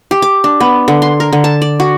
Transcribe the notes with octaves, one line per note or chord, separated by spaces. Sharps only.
G4
D6
D4
B3
D3
C6
A#4
D3
A5
D5
F#4